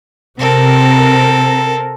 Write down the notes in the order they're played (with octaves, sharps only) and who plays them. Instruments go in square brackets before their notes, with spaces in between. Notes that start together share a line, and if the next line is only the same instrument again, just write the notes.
[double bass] C3 [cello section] C4 A#4 [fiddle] A4